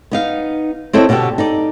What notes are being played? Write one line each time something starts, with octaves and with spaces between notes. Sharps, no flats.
B3 D#4 F5
C4 E4 A4 C#5 D#5
B2 D3 B3 G4 A4
D#4 A4 D5